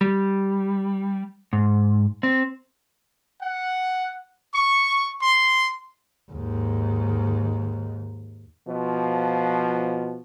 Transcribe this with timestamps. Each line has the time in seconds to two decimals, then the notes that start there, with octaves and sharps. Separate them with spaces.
0.01 G3
1.53 G#2
2.23 C4
3.40 F#5
4.54 C#6
5.21 C6
6.32 D#2 G#2
8.68 B2 F3